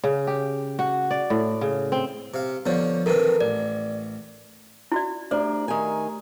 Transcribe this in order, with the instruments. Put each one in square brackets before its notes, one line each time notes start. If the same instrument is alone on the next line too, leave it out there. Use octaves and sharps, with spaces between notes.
[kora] C#3
G4
F#4
D5
A2
C#3
C4
[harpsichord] C3 F5
[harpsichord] D3 F3 [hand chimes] B3 C#5
[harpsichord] D#3 E3 C4 [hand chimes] A4 A#4
[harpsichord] A1 [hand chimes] D5
[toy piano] E4 F#4 D5
[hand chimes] A3 G4 A#5 [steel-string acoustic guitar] D4 [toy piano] C5
[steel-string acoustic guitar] D#3 G#5